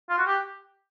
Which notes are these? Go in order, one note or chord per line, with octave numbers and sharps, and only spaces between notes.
F4
F#4
G4